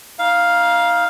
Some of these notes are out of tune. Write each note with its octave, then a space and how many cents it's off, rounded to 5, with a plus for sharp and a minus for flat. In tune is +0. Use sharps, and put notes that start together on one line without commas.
D#4 +25 F5 +0